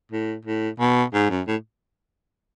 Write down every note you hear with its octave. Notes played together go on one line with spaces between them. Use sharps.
A2
A2
B2
G#2
F#2
A2